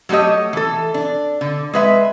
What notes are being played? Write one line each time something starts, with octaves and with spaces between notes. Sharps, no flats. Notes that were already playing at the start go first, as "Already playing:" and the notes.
F#3 G3 A3 G4 D#5
E3 A4
D4
D3
G#3 B4 E5